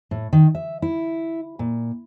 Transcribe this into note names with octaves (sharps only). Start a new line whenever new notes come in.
A2
D#3
E5
E4
A#2